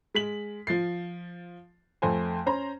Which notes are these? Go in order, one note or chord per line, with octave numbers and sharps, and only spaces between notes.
G#3 B6 F#7
F3 A6 C7
F2 A3 C5 G#5
C#4 C5 A#5